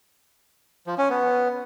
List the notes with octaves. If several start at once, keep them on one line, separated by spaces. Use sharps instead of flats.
F3
C#4
B3